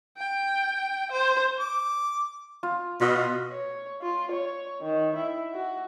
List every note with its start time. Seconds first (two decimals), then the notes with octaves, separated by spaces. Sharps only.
0.18 G5
1.11 C5
1.59 D6
2.63 F4
3.01 B2 F4 D#5
3.52 C#5
4.02 F4
4.31 C#5
4.82 D#3
5.16 E4
5.53 F#4